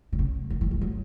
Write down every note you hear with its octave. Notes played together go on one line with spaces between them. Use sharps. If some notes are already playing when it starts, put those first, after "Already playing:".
C3
C#3
D#3
E3
F3
F#3